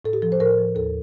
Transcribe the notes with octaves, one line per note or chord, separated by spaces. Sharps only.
A2 A4
G4
F3 A4
C5
A2 A#4
F3
D#2 A4